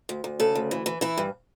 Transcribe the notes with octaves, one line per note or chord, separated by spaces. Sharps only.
D2
D2
C#3 A4
D2
E3
E3
E3 E4
G2